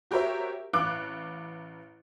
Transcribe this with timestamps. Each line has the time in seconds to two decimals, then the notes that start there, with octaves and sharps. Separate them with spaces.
0.11 F#4 G4 A#4 C5 C#5 E5
0.73 A1 F5 D6 F#6